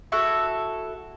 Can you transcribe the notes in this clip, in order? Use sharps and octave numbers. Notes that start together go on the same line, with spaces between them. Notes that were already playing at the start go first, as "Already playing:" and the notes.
E4 F#4 A4